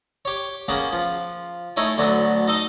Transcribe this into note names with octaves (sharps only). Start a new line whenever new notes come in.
G4 C#5
A#3 B3 C#4 G#4 G#5
F3
A3 D#4 E4 C#5 G#5
D2 D3 F#3 B3
D#4 A4 D#5